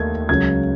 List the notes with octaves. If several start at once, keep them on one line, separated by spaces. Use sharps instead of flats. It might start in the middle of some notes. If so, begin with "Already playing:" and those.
Already playing: D#2 D#3 A3 G#6
C#2 C#3 F#3 G#6